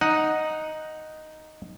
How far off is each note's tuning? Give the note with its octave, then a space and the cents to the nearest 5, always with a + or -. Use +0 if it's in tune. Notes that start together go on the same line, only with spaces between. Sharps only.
D#4 +0 F#5 +0